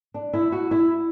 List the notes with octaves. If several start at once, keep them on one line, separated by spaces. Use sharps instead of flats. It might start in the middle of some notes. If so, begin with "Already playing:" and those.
D4
E4
F#4
E4